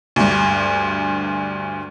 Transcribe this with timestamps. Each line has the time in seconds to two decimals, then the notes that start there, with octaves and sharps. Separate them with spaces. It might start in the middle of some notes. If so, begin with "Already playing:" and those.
0.16 D2 G2